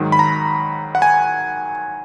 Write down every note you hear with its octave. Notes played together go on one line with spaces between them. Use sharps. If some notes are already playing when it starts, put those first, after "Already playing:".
Already playing: G#2 D#3 F#3
B5
A#5
F#5
G#5